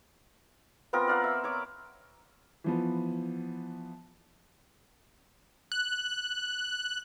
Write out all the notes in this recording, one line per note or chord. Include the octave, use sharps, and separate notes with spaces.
B3 C4 F4 A#4
D5 F5 F#5
E5
C#5 D6
E3 F3 B3
F#6